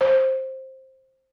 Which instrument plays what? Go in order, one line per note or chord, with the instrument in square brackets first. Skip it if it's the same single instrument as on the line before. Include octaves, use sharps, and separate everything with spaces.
[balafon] C5